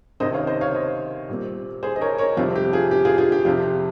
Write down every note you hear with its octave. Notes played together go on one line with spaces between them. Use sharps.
C#2 C3 D#3 C5 D#5
C#5 F5
C5 D#5
C#5 F5
C5 D#5
A#2 G3 C4
G#4 C5
D#5
A#4 C#5
A#4 C#5
F2 C3 G3 C4 F4
G4
F4 G#4
G4
F4 G#4
F4 G#4
G4
F2 C3 F3 F4